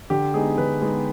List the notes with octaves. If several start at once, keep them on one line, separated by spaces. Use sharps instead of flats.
D3 G4
G#3 B3 D#4 G#4
D3 B4
G#3 B3 D#4